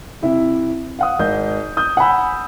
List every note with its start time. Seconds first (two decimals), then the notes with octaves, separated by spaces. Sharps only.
0.22 C3 E4 E5
0.99 F5 F#5 D#6
1.19 G#1 D#5 G6
1.77 D#6 G6
1.97 F#5 G#5 B5 E6